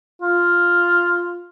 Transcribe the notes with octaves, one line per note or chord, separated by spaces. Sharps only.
F4